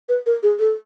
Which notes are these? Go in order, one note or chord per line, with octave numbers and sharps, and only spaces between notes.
B4
A#4
G#4
A4